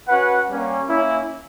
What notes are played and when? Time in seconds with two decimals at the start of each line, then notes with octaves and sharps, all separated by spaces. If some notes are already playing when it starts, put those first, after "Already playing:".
0.08 C#4 F#4 B4 F#5
0.49 G3 A#3 C#4
0.89 A#3 C#4 E4